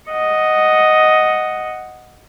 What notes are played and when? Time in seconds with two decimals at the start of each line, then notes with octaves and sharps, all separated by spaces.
0.11 D#5 F#5